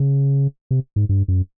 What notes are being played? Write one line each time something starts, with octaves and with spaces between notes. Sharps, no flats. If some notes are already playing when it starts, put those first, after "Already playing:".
Already playing: C#3
C3
G#2
G2
F#2